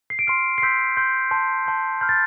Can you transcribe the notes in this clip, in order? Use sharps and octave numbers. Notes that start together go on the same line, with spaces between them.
C7
D7
C6 F6 C7
C7
C6 E6 G6 B6
C6 E6 G6
A5 C6 G6
A5 C6 G6
B5 F6 G6
A6